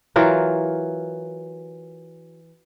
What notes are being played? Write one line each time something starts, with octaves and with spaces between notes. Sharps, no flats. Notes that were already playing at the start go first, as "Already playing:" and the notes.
E3 F#3 F4 A#4